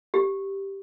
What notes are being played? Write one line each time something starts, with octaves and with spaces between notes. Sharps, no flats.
G4